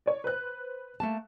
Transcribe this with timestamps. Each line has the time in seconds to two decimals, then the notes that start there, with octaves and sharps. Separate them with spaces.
0.06 C#5 D5
0.24 B4 C5 F#6
1.00 A3 A#3 A5